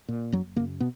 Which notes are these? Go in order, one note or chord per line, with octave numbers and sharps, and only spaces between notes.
A#2
F#1 F#2 F#3
F#2 A#2 C#3 A#3
B2 B3